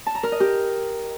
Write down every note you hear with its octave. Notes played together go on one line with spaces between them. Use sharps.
A5
A#5
A#4
D#5
G4